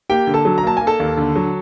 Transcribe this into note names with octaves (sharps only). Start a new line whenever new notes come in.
A#3 G4 G5
D3
A4 A5
F#3
A#5
A#3 A5
A#3 G#5
A4 A5
D#2
D3
F#3